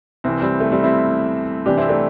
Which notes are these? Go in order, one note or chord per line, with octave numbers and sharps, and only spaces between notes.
C2 C3 E3 C4 E4
G3 C4
A3
G3 C4
C4 E4
C2 C3 E3 D4 G4
C4 E4
A3 D4